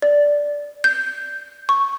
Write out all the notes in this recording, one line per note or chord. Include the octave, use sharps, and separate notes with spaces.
D5
G6
C#6